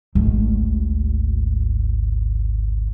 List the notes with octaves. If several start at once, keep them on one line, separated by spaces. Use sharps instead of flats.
G#1 D2